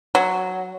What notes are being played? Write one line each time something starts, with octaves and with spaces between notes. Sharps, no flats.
F#3